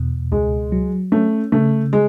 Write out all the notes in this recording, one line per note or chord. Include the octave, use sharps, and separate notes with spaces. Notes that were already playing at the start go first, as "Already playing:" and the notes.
Already playing: E2 B2
C#2 G#3
F#3
A3 C#4
C#3 A3
G#3